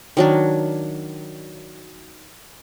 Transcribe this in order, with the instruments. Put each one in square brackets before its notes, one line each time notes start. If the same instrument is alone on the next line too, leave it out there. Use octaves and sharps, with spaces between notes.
[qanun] D#3 F#3 D4